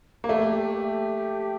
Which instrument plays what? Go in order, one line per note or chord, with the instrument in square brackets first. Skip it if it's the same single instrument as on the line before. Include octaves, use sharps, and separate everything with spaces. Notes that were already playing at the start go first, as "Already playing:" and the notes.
[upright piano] A#3
[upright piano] A3 [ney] G4